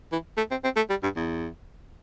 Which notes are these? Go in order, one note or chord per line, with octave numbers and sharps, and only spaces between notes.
E3
A3
C4
C4
A3
G3
G2
E2